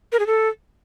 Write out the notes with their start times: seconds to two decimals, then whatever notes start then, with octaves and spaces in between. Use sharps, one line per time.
0.12 A#4
0.19 G#4
0.27 A4